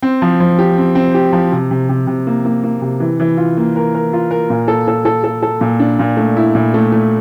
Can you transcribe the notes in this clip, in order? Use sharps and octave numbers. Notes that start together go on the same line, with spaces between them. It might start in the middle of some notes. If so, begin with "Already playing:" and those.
C4
F3
F3
G4
C4
C4
G4
F3
C3
C3
C3
C3
A#3
A#3
A#3
C3
E3
E3
F4
A#3
A#4
A#4
F4
A#4
A#2
A4
A4
A4
A4
A4
A#2
D4
A#2
A3
E4
A#2
A3
A3